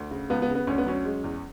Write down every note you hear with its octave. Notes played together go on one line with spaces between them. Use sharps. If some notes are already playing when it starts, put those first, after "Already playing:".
Already playing: D2
C#3
C#2 B3
B3
C#3
B3
D2 C#4
B3
F#3 C#4
G#3
E2